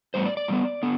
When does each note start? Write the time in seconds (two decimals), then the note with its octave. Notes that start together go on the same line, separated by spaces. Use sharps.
0.14 A2 G3 B3 C5
0.25 D5
0.37 D5
0.48 A2 G3 B3
0.83 D3 B3